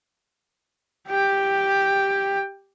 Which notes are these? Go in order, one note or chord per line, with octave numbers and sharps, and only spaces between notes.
G4 G5